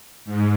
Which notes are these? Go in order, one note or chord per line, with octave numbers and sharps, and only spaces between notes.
G#2